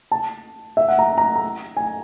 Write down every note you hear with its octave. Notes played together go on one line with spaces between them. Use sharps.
A5
E5
F#5
A#5
A#5
A#5
G#5